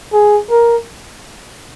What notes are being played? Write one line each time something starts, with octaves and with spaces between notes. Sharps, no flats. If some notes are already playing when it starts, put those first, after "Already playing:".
G#4
A#4